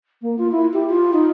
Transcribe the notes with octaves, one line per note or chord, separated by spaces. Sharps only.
A#3
F4
E4
G4
F4
D#4